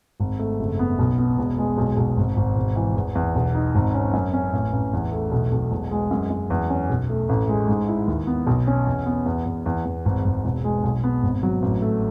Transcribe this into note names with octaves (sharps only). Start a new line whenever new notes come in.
G#1
A3
F#1
B3
B1
B3
E1
G#3
B1
B1
G#1
G#1
E1
E3
E2
E2
B1
D#4
G#1
C#4
F#2
C#4
A1
A1
E2
A3
B1
B1
E1
G#3
F#2
F#2
E2
C#4
B1
A3
A1
G#3
G#2
E4
D#2
B3
B1
C#4
E2
B3
E2
E2
E2
E2
G#1
G#1
E1
G#3
B1
B3
G#1
F#3
A1
A3